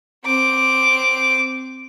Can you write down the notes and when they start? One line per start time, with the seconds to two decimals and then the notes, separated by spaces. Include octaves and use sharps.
0.25 C4 D6